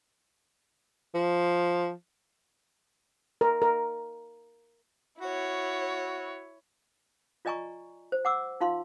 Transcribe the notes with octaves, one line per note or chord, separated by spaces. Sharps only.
F3
A#4
A#4
E4 F#4 C#5
F4 D5 D#5 G#5 A#5 C#6
C5
F#5 D6 E6
D#4 F4 F5 C6